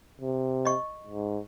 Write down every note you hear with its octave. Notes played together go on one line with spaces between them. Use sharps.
C3
D#5 C#6
G#2